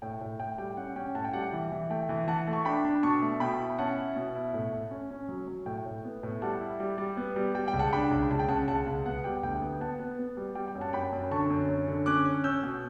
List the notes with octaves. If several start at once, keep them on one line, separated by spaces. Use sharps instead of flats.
A2 G5
A2
A2 G5
G3 G5
C#4 F#5
C#4 G5
A2 F#5 A5
G5
G3 F#5 A5
G5
E3
E3
A3 G5
E3
E3 F#5 A5
A3
A5 C#6
D4 G5 B5
D4
B2 A5 C#6
A3
B2 G5 B5
E4
C#4 F#5 A5
E4
B2
E4
A2
A2
C#4
C#4
F#3
F#3
A2 G5
A2
B3
A2
G3 F#5 A5
E4
G3
G3
B3
G3
G3 G5
G5
C#2
F#5 A5
D4 G5 B5
C#2
C#2 A5
G5
C#3 F#5 A5
C#2 F#5 A5
C#2
B3 F#5
G3 G5
D2 G5
B3
B3 F#5 A5
B3
B3
G3
G3 G5
G5
F#2
F#5 A5
F#2 G5 B5
F#2
D3 A5 C#6
F#2
F#2
D3
C#4 D6 F#6
C#4
C#4 E6 G6
B2